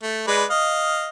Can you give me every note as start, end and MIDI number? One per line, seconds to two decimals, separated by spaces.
0.03 0.27 57
0.28 0.44 56
0.28 0.44 71
0.28 0.44 74
0.50 1.07 75
0.50 1.07 77